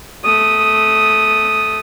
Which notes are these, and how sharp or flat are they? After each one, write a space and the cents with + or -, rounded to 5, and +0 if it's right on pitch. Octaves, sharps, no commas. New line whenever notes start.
A3 -15 D#6 +0